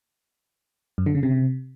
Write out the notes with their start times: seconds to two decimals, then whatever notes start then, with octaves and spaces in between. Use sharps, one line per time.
0.98 F#2
1.06 D3
1.15 C#3
1.23 C3